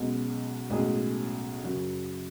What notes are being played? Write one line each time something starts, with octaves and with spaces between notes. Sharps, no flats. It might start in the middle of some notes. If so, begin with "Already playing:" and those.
Already playing: B1 B2 G#3 C#4 F#4
B1 A2 G#3 C#4 G#4
F#2 C#3 F#3